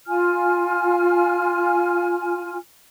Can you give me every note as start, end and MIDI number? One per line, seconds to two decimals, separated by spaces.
0.07 2.56 65
0.07 2.56 80
0.07 2.56 89